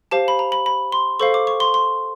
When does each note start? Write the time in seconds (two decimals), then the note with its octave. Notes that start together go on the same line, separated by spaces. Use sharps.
0.11 G4 C5 F5 A5
0.28 B5
0.39 A#5
0.52 B5
0.66 B5
0.92 C6
1.20 A4 C5 F5 C#6
1.34 D6
1.47 C#6
1.60 C6
1.74 C6